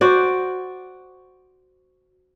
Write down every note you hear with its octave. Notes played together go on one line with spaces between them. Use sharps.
F#4 C5 D5